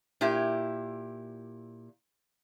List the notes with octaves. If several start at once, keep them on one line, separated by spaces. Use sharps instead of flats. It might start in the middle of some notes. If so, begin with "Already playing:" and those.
A#2 E4 G4